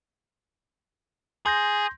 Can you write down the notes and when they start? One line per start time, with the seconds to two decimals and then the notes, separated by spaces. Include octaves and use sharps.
1.46 G#4 C6 G6 A#6